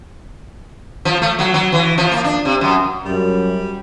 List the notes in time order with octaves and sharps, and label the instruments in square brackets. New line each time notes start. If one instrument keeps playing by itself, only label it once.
[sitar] F3
A3
F#3
F#3
E3
F3
A#3
D4
C3
F#2
[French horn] F#2 [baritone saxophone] G3